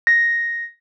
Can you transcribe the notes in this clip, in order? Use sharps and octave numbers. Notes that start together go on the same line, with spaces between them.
A#6